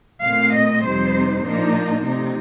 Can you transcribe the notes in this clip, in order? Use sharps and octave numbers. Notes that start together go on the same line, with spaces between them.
A#2 A3 C4 F5
D#5
F2 C3 G3 C4 D#4 C5
A#2 F3 A#3 D4 D#4
C3 F3 A3 D#4